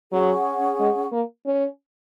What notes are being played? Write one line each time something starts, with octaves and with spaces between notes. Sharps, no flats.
F#3 C#4 G#4 F#5 C#6
G#3
A#3
C#4